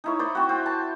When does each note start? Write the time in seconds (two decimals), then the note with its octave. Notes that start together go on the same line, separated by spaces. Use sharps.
0.04 D#4 E4 C#5
0.19 C5 D5 B5
0.35 C4 F#4
0.49 C4
0.66 A5